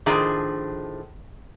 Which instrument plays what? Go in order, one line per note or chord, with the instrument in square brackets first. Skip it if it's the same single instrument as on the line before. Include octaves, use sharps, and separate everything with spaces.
[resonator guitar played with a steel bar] A2 D#3 F3 D4 G#4